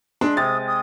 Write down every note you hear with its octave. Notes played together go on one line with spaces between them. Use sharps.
G#3 D4
C3 D#6 A6
D#6